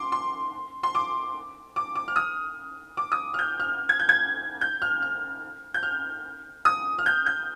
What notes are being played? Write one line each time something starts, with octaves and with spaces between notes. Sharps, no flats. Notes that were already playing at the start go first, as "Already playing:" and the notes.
Already playing: C6 D6
C6
C6
D6
D6
D6
F6
D#6
D6
D#6
F6
G6
F6
G#6
G6
G#6
G6
F6
F6
G6
F6
D#6
F6
G6
G6